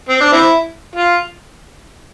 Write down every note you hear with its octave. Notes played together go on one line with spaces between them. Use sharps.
C4
D4
C4 E4
F4